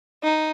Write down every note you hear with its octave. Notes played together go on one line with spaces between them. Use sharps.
D#4